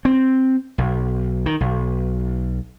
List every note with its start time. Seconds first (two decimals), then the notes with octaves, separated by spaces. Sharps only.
0.05 C4
0.78 B1
1.46 D#3
1.60 B1